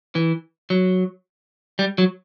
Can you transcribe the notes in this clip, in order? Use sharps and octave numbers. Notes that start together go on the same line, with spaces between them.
E3
F#3
G3
F#3